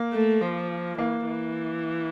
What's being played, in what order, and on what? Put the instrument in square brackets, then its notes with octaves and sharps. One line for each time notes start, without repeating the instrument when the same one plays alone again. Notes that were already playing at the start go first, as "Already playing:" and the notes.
Already playing: [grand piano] A#3
[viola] A3
F3
[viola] E3 [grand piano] A#3
[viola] E3